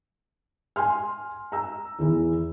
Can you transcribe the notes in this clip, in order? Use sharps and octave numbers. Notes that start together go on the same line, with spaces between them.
G#5 C6 F6
A#5 E6
E2 E3